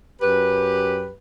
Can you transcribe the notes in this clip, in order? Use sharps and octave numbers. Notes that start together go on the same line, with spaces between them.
F#2 G4 B4